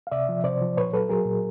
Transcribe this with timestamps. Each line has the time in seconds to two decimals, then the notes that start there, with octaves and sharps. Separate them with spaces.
0.07 F5
0.12 C3 D5 E5
0.29 F3
0.44 C3 C5 D5
0.61 F3
0.77 A#2 B4 C#5
0.93 F#3 A4 B4
1.09 F#3 G#4 A#4
1.26 A#2